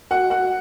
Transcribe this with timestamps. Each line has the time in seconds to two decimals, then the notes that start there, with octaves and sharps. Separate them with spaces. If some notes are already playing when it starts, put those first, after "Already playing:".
0.11 F#4 F#5
0.30 F#4 F#5